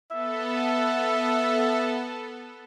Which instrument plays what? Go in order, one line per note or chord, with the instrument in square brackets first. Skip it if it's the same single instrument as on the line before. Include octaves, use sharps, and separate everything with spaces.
[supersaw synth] B3 A4 [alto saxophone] E5